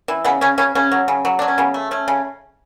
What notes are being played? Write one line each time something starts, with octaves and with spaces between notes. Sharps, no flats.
E3
C#3 B3
C#3 C#4
C#3 C#4
C#3 C#4
F#3
C#3
F#3
F#3 D4
C#4
C#3 B3
A3
A3 C#4
C#3